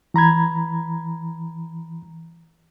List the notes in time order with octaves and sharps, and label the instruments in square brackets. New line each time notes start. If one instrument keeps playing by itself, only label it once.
[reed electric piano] E3 A#5 B5 G#6